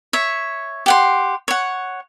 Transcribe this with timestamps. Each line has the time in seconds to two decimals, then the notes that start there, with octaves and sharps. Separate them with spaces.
0.13 C#5 E5
0.86 G4 F#5 C6
1.48 C#5 F#5